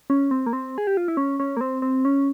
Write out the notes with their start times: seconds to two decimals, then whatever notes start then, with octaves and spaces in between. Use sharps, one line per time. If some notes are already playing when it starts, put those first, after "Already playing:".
0.10 C#4
0.31 C4
0.46 A#3
0.53 C4
0.78 G#4
0.87 G4
0.97 F4
1.08 E4
1.17 C#4
1.40 C#4
1.57 A#3
1.61 C4
1.82 C4
2.05 C#4